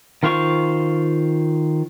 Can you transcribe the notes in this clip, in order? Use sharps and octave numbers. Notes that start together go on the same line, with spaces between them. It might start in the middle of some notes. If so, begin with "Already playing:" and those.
D#3 F4 C5 F5 C#6